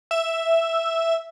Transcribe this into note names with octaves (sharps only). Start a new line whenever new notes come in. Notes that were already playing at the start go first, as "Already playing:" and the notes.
E5